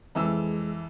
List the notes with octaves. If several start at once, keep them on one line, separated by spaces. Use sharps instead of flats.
F2 E3 G#3 E6